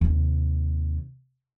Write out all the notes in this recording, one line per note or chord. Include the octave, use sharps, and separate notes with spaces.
D#2 C3